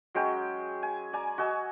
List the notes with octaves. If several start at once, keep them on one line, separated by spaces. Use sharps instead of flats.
F#3 G#3 C#4 G5
G#5
D5 G#5 A#5
F#4 D#5 G#5 E6